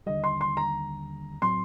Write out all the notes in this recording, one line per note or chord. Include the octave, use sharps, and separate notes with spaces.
D#2 D3 G3 D#5
C6
C6
A#5
A2 F#3 C4 C6